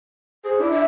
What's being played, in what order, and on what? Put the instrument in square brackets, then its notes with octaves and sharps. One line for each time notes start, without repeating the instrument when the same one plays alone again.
[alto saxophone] G#4 [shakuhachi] C5
[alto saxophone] D4 [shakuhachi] E4
[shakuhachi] E5